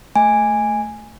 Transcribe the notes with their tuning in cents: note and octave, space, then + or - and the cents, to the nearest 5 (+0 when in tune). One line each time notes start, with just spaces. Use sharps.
A3 +5 G#5 -10